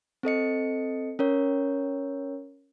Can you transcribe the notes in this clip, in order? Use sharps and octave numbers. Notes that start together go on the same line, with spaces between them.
C4 A4 D#5 C#7
C#4 A#4 C#5